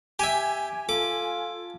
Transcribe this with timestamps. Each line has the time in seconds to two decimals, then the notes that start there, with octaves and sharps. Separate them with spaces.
0.19 G4 E5 G#5
0.89 F4 A4 D6